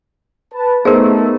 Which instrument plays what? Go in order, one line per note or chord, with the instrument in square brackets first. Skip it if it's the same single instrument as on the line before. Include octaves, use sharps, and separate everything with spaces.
[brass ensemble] B4 A5
[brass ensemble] A3 [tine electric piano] B3 D#4 [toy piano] G#4 A#4 [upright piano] C5